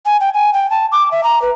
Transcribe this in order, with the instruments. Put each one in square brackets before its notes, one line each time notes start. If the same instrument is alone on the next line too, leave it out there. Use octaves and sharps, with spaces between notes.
[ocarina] G#5
G5
G#5
G5
A5
D6
E5
A#5
B4